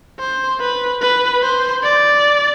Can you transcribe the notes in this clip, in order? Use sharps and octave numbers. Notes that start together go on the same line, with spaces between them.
C5
B4
B4
C5
D5